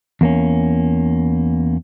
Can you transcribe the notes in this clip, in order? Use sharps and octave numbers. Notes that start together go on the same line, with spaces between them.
E2 A#3 C#4